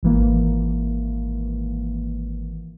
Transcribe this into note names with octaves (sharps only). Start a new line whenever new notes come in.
G#1 E3 A#3